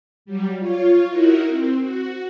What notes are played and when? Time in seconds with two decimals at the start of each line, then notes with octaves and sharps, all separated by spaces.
0.25 F#3 G3
0.59 F4 C#5
1.09 D#4 E4 F#4 A#4
1.47 C4
1.80 F#4